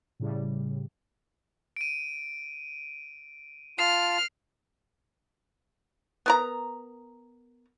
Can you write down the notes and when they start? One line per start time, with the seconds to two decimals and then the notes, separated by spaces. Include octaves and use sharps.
0.20 A2 C#3 G3
1.77 D7 D#7
3.79 F4 A5 F6 C7
6.26 B3 A#4 A#5